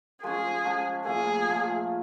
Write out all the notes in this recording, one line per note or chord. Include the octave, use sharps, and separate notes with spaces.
F3 G#3 C#4 G#4
F3 G#3 C#4
A#2 F3 A3 G#4
A#2 F3 A3